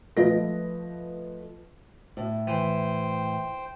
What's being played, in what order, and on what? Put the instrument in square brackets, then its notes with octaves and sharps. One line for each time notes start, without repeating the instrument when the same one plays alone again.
[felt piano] F3 A3 B4 D#5 A#6
[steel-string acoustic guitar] A2
[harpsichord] E3 [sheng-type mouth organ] C5 G5